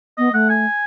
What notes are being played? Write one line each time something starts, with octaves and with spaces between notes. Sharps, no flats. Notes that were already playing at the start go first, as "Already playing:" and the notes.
B3 D#5
A3 F#5
G#5